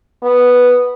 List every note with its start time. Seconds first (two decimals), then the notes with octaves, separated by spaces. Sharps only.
0.22 B3